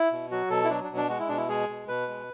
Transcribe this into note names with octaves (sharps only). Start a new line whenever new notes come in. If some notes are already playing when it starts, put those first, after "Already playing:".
Already playing: E4
B2
F#3 F#4
B2 A4
E4
F#3 D4
D4
B2
D4
G#3 F#4
E4
B2 D4
E4
G#3 G#4
B2
B2 B4
G#3